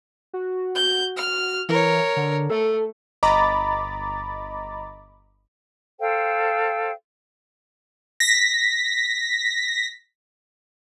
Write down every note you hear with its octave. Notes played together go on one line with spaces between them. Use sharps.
F#4
G6
F6
E3 A#4 C#5
D3
A3 A4
G1 D#5 A#5 B5 D6 A6
A4 C5 F5 G5
A#6 B6